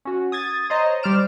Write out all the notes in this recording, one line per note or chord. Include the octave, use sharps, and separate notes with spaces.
C#4 F#4
D#6 G#6 A6
C5 C#5 D#5 A#5
G3 C5 D5 F6 D7 E7